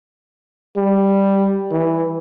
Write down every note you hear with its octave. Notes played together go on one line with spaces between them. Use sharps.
G3
E3